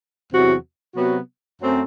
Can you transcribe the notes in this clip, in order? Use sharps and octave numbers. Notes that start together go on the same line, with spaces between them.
E2 C3 F#3 C4 F#4
C3 F#3 B3 F#4
F#2 F#3 A3 C4